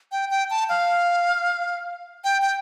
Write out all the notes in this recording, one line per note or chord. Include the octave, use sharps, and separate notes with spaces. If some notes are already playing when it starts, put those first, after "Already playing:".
G5
G5
A5
F5
G5
G5